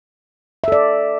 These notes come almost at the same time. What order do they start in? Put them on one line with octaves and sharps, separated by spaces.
E5 A4 D5